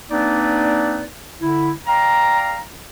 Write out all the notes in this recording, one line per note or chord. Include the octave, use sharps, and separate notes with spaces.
A#3 C4 D4 D#4 B4 D5
D3 E4
D5 F5 G5 A#5